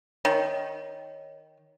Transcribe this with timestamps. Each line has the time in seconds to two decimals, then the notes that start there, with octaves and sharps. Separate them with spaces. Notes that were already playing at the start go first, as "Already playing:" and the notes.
0.25 D#3 C#5